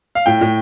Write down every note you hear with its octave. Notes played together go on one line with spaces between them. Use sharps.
F5
A2 G5
A2